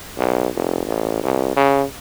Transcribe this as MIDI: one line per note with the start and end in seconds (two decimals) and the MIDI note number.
0.18 0.48 35
0.55 0.82 29
0.86 1.23 33
1.23 1.56 36
1.56 1.84 49